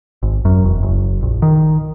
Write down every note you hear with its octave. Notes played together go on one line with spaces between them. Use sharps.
G#1
F#2
E1
F#1
A#1
D#3